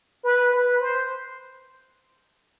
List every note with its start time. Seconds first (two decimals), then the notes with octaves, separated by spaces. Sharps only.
0.24 B4
0.53 B4
0.81 C5